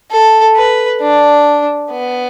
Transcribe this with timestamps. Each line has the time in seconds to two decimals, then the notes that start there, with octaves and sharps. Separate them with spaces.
0.11 A4
0.56 B4
1.01 D4
1.91 B3